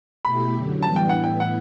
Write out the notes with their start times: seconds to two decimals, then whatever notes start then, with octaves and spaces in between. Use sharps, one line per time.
0.25 B2 A3 E4 G4 B5
0.54 F#2 D3 F#3
0.82 A2 E3 G3 B3 D4 A5
0.96 G5
1.09 A2 E3 B3 E4 F#5
1.24 G5
1.40 F#5